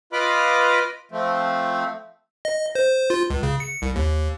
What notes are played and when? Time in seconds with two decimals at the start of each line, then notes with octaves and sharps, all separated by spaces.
0.13 F4 B4 D#5 B5 D6 F6
1.12 F3 A3 C4
2.45 D#5
2.75 C5
3.10 F4
3.30 C#2
3.43 C#3
3.60 C#7
3.82 C2
3.96 D#2